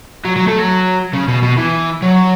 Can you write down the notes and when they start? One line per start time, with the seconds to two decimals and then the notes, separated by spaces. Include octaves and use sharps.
0.25 F#3
0.36 F#3
0.48 A3
0.59 F#3
1.14 C#3
1.28 B2
1.43 B2
1.58 E3
2.02 F#3